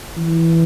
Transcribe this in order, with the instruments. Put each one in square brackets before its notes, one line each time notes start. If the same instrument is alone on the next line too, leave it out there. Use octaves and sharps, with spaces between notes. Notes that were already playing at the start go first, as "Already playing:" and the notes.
[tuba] E3